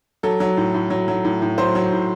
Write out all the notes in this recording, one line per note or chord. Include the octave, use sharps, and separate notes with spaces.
F#3 A4
F#3
A2
A2
F#3
F#3
A2
A2
F#3 C5
F#3
A2